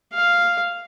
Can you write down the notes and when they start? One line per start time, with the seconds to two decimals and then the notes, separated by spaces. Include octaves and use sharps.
0.13 F5